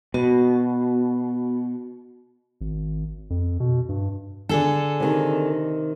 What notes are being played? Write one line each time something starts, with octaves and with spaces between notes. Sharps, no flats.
B2 B3 F#4
G#1
F2
B2
G2
D3 G#4 A4
C3 D#3